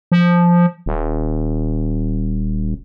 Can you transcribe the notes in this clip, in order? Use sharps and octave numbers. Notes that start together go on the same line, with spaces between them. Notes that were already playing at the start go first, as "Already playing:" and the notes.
F3
D#1